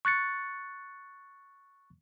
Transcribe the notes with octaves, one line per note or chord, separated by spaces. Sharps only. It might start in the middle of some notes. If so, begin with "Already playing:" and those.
C#6 F#6 A6 C#7